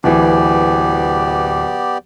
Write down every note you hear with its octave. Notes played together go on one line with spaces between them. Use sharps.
D1 E3 B3 G4 D5